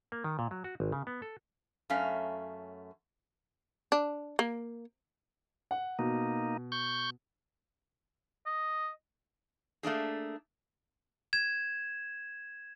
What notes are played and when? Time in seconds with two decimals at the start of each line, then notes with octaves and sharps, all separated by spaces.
0.12 A#3
0.24 D#3
0.39 A#2
0.51 F#3
0.64 F#4
0.80 G#1
0.92 C#3
1.07 B3
1.22 A4
1.90 F#2 A3 C#4 F5
3.92 D4
4.39 A#3
5.71 F#5
5.99 B2 A#3 D#4
6.72 C#6 G6
8.46 D#5
9.83 A3 A#3 D4 G#4
11.33 G#6 E7